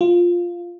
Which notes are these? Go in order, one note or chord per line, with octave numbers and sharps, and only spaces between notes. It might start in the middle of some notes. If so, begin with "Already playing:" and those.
F4